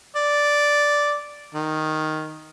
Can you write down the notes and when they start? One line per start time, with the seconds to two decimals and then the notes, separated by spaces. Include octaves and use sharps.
0.16 D5
1.54 D#3